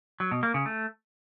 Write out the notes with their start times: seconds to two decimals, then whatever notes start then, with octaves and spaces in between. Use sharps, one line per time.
0.20 F#3
0.31 B2
0.43 A#3
0.54 C#3
0.66 A3